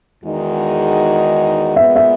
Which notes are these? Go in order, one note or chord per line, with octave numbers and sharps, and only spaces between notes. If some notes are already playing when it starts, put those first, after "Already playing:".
E2 D#3 G#3 D#4 F#4
A#2 G#3 B3 E5
E5